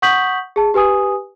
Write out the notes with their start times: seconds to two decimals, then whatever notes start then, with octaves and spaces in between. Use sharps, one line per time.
0.02 F#5 C#6 D#6 G6 B6 F#7
0.56 G#4 A5
0.74 G4 B4 G#5 D#6